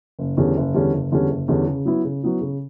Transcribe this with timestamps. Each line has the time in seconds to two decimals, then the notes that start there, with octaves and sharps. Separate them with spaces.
0.19 F#1
0.37 E2 D3 G3 C#4
0.57 F#1
0.74 E2 D3 G3 C#4
0.93 F#1
1.11 E2 D3 G3 C#4
1.30 F#1
1.48 E2 D3 G3 C#4
1.67 C#3
1.85 F#3 B3 E4
2.04 C#3
2.23 F#3 B3 E4
2.41 C#3